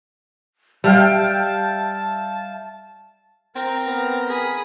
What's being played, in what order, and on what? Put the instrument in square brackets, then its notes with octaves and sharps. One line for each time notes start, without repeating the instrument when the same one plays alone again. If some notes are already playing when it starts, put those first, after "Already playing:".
[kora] G3 [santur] E5 F5 G5 [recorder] A5
[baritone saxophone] C4 [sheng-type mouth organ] A#4 [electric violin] A#5
[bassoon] B3
[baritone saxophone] G#4 [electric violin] B5 D#6